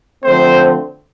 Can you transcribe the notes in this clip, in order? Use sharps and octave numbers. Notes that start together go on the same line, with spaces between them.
D3 F3 A3 C4 C5